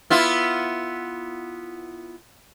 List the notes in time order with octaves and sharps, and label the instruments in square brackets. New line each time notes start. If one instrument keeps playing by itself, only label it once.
[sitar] B3 E4 F4